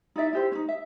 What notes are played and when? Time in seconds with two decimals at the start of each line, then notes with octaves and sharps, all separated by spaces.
0.16 D#4 E4 D5 E5
0.33 E4 G4 C5
0.52 C#4 D#4
0.69 E5